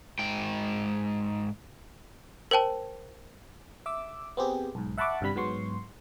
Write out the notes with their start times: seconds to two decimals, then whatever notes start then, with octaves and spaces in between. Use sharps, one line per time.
0.19 G#2 G5
2.51 A#4 C5 G5 A5
3.86 E5 D6 E6
4.37 B3 C4 G4 G#4
4.75 B1 G#2
4.98 E5 F#5 A5 B5 C#6 D6
5.21 G1 G2 C3 G3 B5 B6
5.36 G#2 F#3 B3 C6 C#6